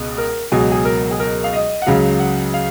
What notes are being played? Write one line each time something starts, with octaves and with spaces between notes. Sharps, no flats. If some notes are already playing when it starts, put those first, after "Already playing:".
Already playing: C#2 B2 B3
A#4
C#2 B2 F#3 G#4
G#4
A#4
G#4
A#4
F5
D#5
F#5
C#2 C#3 F#3 F5
F#5
F5